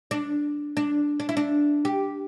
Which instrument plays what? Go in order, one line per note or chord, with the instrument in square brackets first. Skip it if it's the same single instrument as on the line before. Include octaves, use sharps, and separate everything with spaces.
[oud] D4
D4
D4
E4
D4
G4